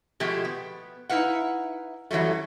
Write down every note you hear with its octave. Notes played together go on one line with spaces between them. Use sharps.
B2 F3 G#3 A3 G4
B3
D#4 E4 B4 F5 F#5
F#2 E3 F#3 G3 A3